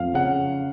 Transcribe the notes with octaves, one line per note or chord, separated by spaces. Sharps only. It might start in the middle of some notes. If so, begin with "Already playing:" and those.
Already playing: F2 F5
C#3 F#5